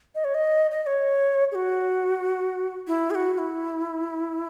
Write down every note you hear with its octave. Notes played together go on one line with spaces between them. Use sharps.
D#5
C#5
D#5
D#5
D#5
C#5
G#4
F#4
E4
G#4
F#4
F#4
E4